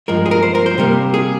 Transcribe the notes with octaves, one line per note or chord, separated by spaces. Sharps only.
G2 F3 G#3 A#4
G#4
A#4
C5
A#4
C5
C3 G3 A#3 A#4
G#4